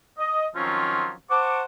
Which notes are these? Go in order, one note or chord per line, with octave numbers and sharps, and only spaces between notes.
D#5
D#3 F3 F#3 C4 C#4 F4
C5 F#5 A5 C#6 D6